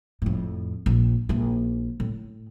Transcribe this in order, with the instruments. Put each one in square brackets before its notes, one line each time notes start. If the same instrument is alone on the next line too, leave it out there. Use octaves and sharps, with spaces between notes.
[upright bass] F2 A2
A#1
A#1 E4
A2